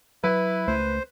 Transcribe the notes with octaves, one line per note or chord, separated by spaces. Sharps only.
F#3 E4 B4
C#2 A3 C5